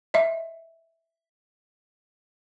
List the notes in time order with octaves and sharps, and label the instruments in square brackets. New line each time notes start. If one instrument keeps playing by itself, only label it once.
[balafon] D#5 E5